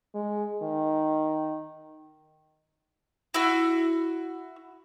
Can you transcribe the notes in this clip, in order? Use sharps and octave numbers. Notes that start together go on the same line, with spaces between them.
G#3
D#3
E4 F#4